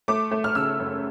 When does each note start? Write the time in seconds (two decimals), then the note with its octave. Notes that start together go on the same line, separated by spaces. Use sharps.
0.08 A3 D6
0.31 A3
0.44 F6
0.55 C#3 E6
0.79 F#2